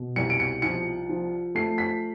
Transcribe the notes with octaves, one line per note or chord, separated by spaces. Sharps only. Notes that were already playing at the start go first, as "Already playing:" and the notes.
Already playing: B2
C2 C#7
D7
C#7
F3 C#7
F3
A3 C7
B6